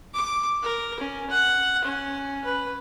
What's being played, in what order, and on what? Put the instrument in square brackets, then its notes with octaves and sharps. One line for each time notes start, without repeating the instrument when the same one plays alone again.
[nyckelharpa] D6
A#4
C#4
F#5
C#4
B4